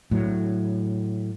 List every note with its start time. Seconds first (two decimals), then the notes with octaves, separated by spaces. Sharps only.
0.11 A2 F#3